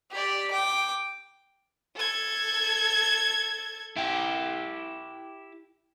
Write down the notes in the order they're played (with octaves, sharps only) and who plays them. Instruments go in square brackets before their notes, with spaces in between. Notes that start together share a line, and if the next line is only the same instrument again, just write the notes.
[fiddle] G4 D5
G5 D6
[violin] A4 G#6
[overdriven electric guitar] E4 G4